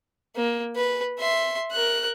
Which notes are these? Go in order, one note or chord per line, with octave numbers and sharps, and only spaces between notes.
A#3
B4
E5 C6
A#4 F#6